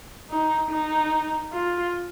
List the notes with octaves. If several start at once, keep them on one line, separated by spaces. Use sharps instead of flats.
D#4
D#4
F4